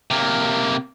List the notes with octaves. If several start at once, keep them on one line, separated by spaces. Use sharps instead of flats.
C3 A#3